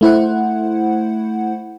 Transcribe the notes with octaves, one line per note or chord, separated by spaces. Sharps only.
A3 E4 C5 F#5